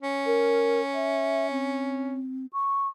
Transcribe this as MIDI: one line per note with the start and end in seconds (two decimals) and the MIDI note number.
0.01 2.20 61
0.26 0.81 70
0.94 1.50 76
1.51 2.46 60
2.53 2.88 85